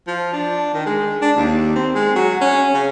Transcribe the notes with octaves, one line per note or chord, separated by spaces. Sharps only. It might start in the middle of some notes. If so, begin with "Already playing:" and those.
F3
D4
D#3
G#3
D4
D#2
C4
G#3
F#3
C#4
C#3